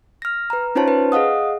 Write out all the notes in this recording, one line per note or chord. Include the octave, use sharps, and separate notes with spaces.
F6 A#6
B4 A#5
C#4 D#4 F4 C5 C#5 A5
B4
G#4 D#5 F5 F#5 D#6